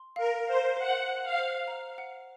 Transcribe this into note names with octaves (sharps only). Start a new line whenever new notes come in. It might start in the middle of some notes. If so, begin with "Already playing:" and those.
Already playing: C6
A#4 F5
C5 F5
C5 F#5
F#5
F5
C5
A#5
F#5